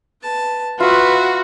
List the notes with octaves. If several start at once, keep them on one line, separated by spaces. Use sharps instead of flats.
B4 A5
F4 F#4 B4 E5 C#6